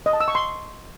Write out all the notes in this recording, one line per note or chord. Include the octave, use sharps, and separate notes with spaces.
D#5
A5
E6
C#6
C6